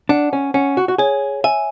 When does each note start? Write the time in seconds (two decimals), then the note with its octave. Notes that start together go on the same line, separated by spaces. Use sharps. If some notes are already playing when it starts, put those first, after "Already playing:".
0.09 D4 F#5
0.33 C#4
0.54 C#4 F#5
0.77 F#4
0.88 F#4
0.98 G#4 C#5
1.44 E5 G#5